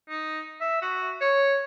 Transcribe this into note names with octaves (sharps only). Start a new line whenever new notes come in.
D#4
E5
F#4
C#5